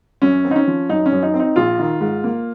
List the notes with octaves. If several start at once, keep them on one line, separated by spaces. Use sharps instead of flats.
F#2 C#4
C4
D#4
C#4
F3
F#2 D#4
C#4
F#2
D#4
C4
D#4
A#1 F4
D#3
G#2
A#3